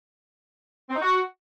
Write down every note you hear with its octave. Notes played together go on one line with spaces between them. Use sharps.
C4
D#4
F#4